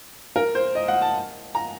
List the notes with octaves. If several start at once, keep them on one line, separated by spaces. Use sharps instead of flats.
A#4
C5
D#5
F#5
A5
A#5